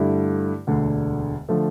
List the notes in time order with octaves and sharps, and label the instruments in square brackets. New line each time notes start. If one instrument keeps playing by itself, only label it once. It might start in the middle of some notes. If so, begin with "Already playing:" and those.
Already playing: [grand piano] G2 D3 A3 E4
E1 D2 D3
D3 F3 A3